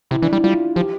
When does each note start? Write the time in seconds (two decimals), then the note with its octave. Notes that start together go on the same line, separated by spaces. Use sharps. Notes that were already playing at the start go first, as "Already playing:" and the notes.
0.11 C3 E4
0.22 E3 D4
0.33 G3 E4
0.44 G3 F4
0.76 F3 G4